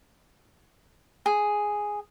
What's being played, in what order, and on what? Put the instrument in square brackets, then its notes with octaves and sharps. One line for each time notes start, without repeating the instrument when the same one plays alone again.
[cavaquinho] G#4